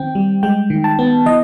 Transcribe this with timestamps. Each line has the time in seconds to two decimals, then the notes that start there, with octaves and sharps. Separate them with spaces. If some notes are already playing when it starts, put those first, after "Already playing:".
Already playing: D#3 C4 G5
0.15 G3
0.43 G#3 G5
0.70 D#3
0.84 A5
0.99 B3
1.26 E3 D#5